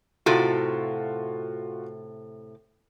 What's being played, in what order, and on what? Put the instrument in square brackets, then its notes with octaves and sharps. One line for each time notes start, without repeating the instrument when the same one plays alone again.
[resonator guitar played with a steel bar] A2 C3 A4 [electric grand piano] F4 F#4